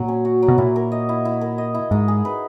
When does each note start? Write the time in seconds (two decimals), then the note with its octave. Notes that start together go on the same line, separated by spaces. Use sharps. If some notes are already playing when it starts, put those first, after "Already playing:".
Already playing: A#2 F#3
0.08 C#4
0.25 F#4
0.43 F#3
0.48 B2
0.58 A#2 E4
0.76 A#4
0.92 D#5
1.09 E4
1.25 E4
1.41 A#4
1.58 D#5
1.74 E4
1.91 G#2 D#4
2.08 G#4
2.25 B4